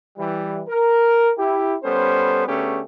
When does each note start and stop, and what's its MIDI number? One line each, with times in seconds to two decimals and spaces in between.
0.18 0.62 52
0.18 0.62 55
0.68 1.32 70
1.38 1.75 64
1.38 1.75 67
1.83 2.45 55
1.83 2.45 59
1.83 2.45 61
1.83 2.45 69
1.83 2.45 72
2.47 2.81 50
2.47 2.81 57
2.47 2.81 59
2.47 2.81 61
2.47 2.81 67
2.47 2.81 68